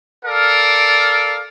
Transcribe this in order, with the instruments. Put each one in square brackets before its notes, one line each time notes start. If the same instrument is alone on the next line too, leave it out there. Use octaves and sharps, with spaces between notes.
[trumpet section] A4 A#4 D5 F5